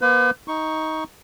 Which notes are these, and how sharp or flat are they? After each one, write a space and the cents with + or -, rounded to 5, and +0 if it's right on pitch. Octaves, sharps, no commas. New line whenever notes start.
A#3 +45 B4 +40
D#4 +15 C#6 +0